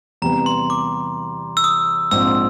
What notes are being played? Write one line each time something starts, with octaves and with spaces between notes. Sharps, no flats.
E2 C3 E3 G3 B3 A#5
C6
D6
E6
D#6
A#1 G#2 F3 G#3 C4 E6